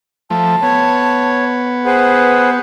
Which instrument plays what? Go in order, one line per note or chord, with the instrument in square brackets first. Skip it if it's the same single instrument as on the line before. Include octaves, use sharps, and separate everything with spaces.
[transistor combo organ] F3 A3 [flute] A5
[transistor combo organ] B3 [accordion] C#5
[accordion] G#4 B4 C5 [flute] F#5